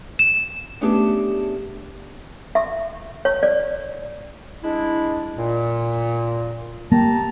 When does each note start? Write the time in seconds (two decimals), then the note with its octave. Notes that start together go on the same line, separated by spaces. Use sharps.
0.19 E7
0.81 A3 B3 C#4 D4 G4 G#4
2.55 E5
3.25 C#5
3.43 D5
4.64 G#3 D4 E4
5.37 A#2
6.92 A#3 G4 A5 A#5